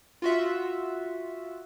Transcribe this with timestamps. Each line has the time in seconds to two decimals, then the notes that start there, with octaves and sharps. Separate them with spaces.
0.22 F4 F#4 E5